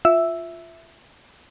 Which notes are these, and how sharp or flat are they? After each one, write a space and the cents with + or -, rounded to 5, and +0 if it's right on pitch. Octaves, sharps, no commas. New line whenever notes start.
F4 +0 E5 +0 E6 +0